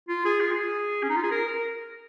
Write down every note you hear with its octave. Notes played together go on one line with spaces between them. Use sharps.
F4
G#4
F4
G#4
C#4
D#4
F4
G#4
A#4
A#4